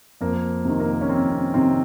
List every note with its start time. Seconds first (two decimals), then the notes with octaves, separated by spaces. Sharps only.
0.21 F2 A#3
0.65 C3 D#3
0.80 A#3
1.01 C#4
1.09 F2 C4
1.32 C4
1.54 C3 D#3 C4